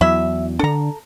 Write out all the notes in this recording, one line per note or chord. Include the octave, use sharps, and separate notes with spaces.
E2 F#3 E4 E5
D3 D4 A4 A#5